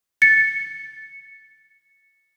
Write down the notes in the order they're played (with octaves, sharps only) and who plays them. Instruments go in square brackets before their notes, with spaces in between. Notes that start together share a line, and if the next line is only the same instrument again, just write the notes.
[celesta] A6 C#7